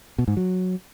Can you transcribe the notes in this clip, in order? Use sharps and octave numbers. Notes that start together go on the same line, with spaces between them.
B2
G#2
F#3